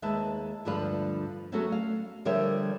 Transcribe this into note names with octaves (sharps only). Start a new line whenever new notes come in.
D#2 G#3 D#4 B4 E5 A5
D2 G2 D3 F3 B4 F5
F#3 A3 B3 C#4 F#4 A4
F5
D3 F3 G3 A#4 C#5 E5